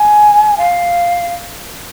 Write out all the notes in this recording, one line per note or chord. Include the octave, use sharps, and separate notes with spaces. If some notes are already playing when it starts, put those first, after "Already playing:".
Already playing: G#5
F5